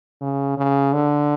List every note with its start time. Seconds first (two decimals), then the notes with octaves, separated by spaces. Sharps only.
0.21 C#3
0.57 C#3
0.93 D3